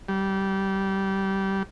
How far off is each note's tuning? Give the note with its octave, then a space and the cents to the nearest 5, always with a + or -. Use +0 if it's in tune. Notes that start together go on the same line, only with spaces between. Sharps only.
G3 -20